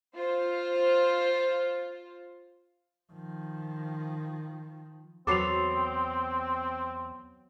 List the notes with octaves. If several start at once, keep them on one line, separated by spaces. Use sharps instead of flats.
F4 C5
D#3 F3
E2 F#3 B3 C4 A4 D6 C7 F7